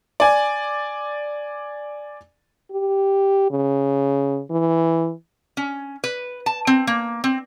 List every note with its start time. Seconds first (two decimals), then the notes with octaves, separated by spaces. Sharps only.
0.20 D5 G#5
2.71 G4
3.51 C#3
4.51 E3
5.57 C#4
6.04 B4
6.46 A5
6.67 C4
6.87 A#3
7.24 C4